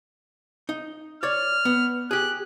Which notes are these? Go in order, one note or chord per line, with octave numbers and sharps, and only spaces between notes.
D#4
C#5 D5 F6
B3
G4 G#4 F#6